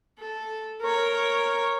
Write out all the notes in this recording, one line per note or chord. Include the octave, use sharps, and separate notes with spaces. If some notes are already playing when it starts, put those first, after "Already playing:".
A4
A#4 C#5